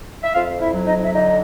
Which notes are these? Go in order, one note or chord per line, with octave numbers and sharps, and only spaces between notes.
E5
F2 F4 F5
E4 E5
F#3
D#4 D#5
E5
D3 D#4 D#5